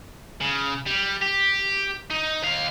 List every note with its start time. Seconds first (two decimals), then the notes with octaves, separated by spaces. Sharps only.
0.41 C#3
0.86 G3
1.21 G4
2.10 D#4
2.42 D#2 F5